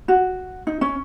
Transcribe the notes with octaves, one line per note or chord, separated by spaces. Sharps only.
F#4
D#4
C#4